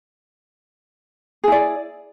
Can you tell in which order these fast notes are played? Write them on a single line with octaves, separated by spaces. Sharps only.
G#4 E4 D5